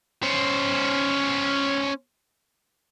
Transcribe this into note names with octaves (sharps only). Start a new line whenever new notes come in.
C#4 C5